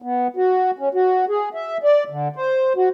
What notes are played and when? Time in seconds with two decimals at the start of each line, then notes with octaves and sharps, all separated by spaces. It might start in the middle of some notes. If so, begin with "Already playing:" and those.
0.02 B3
0.37 F#4
0.79 C#4
0.94 F#4
1.29 G#4
1.54 E5
1.84 D5
2.10 D3
2.36 C5
2.76 F#4